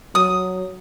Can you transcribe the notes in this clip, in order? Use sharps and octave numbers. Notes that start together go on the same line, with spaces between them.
F#3 D#6